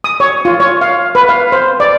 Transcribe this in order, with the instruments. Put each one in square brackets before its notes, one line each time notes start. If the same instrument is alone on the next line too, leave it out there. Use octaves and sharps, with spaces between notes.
[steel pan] D#6
C#5
F4
C#5
F5
B4
F5
C5
D5